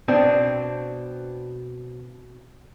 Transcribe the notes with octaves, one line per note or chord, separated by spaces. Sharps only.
B2 C4 D4